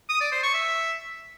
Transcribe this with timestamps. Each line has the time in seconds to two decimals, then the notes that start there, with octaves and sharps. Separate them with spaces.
0.09 D#6
0.21 D5
0.32 C5
0.43 C#6
0.54 E5